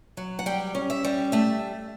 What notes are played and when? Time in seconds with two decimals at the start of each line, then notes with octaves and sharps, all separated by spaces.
0.17 F#3
0.39 F#5
0.46 G3 G5
0.75 C#4
0.90 E5
1.04 G3
1.32 A3 E5